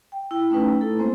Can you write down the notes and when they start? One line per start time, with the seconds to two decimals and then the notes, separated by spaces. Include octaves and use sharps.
0.12 G5
0.31 E4 G5
0.50 A3 C#4 D#4 B4
0.62 A#5
0.81 A3 E4 A4
0.98 G#3 A#3 C4 C5